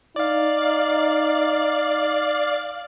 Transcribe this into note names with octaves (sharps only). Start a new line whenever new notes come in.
D#4 D5 F5